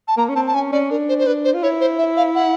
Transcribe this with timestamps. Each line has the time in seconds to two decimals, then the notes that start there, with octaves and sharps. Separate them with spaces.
0.08 A5
0.17 A#3 A#5
0.29 C#4
0.35 C4 A5
0.47 A5
0.54 C#4 G#5
0.72 C#4 D5
0.90 D4 A#4
1.09 C5
1.19 C5
1.26 D4 B4
1.44 C5
1.54 F4
1.63 E4 C#5
1.80 C5
1.98 E5
2.17 F5
2.35 F#5